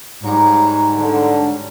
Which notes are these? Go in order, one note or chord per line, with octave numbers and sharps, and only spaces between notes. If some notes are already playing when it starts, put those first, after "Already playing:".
G#2 F#3 G3
D3